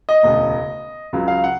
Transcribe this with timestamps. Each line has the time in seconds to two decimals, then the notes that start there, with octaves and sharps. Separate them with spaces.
0.09 D#5
0.23 E1 D2 C#3
1.13 C#2 C#3 F#3
1.28 F5
1.44 F#5